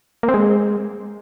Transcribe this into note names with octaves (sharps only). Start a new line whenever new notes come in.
A#3
C4
G#3